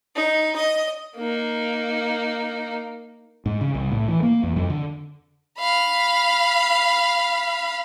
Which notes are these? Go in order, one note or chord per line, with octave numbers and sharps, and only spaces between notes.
D#4
D#5
A#3 D#4
G#2
C#3
C2
A2
E3
A#3
E2
F2
D3
F5 B5